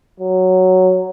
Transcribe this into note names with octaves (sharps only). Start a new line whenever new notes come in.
F#3